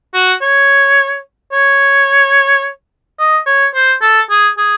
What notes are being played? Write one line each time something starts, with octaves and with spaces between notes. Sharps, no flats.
F#4
C#5
C#5
D#5
C#5
C5
A4
G#4
G#4